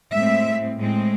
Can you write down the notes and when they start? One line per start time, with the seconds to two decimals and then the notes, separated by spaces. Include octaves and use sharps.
0.12 A2 G#3 C4 E5
0.76 A2 G#3 C4